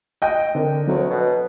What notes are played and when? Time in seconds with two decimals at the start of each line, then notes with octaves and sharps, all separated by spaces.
0.22 D#5 G5
0.55 D3 D4 A#4
0.87 D2 F#3 A4 C#5
1.10 B2